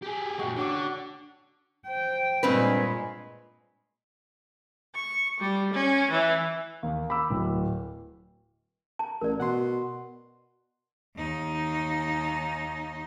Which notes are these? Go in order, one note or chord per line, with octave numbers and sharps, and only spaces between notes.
G4 G#4
A#2 G#3 F#4 G5
D3 C#4 F#4 D6
C5 G5
G2 A#2 G#3 C4 B4
C#6
G3
C#4
E3
D#2
B5 D6 E6
D1
A5
A1 A#4 D5
B2 F#5 C6
D#2 D#4